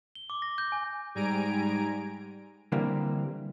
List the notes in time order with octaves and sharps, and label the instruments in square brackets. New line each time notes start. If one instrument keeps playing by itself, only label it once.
[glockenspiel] G7
D6
A#6
G6
G#5
[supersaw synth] G#2 G3 G#5 A#5 D7
[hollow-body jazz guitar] D3 E3 G3 A#3 C4